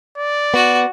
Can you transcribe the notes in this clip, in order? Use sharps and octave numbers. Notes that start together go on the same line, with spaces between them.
D5
B3 F#4